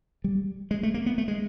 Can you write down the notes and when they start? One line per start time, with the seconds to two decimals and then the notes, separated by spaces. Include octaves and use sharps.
0.24 G3
0.71 G#3
0.83 A3
0.94 A#3
1.06 B3
1.18 A3
1.28 G#3